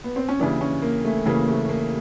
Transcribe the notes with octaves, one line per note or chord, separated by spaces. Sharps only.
B3
C4
C#4
D#2 C#3 E3 D4
C#4
A#3
A3
D#2 C#3 E3 A#3
A3
A#3